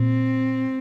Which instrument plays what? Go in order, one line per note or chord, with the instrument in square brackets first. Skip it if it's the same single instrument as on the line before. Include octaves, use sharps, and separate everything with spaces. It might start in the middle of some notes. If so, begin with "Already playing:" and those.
Already playing: [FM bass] A#2 [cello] C4